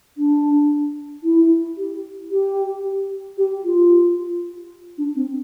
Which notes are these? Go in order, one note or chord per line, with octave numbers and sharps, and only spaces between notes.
D4
E4
G4
G4
G4
F4
D4
C4